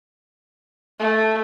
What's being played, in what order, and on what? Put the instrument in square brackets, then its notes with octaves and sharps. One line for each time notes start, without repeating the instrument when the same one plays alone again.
[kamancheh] A3